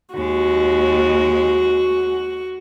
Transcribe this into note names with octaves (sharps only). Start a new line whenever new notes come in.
D#2 G#3 F#4